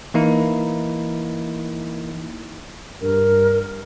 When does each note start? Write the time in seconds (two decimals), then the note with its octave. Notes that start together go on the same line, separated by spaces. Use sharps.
0.14 E3 A#3 D#4 E4
3.02 G2 A#4